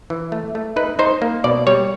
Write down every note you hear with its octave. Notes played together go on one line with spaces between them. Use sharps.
E3
A3
A3
D#4 B4
D#4 C5
A#3
B2 D5
G3 C#5